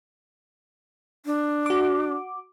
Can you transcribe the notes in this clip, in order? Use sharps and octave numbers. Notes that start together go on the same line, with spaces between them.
D4
F#4 D6